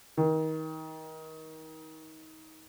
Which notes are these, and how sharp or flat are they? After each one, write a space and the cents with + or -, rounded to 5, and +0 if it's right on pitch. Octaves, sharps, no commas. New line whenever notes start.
D#3 +30